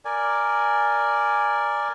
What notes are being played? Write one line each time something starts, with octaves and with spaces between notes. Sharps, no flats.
A#4 D5 G#5